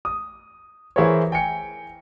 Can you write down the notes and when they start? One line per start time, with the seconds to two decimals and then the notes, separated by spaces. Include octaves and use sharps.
0.05 D#6
0.96 E3 E4 G#4 A#4 C5 C#5
1.32 G5 G#5 C#7